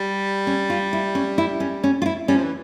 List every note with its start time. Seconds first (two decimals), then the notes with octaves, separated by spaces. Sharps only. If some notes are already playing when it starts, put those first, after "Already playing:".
Already playing: G3
0.47 C#4
0.70 F4
0.93 E4
1.15 C#4
1.38 E4
1.60 C#4
1.84 C#4
2.02 F4
2.06 E4
2.28 G3 C#4
2.36 F3
2.44 E3